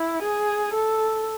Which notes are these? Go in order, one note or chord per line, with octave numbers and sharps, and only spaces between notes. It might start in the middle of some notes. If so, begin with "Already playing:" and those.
Already playing: E4
G#4
A4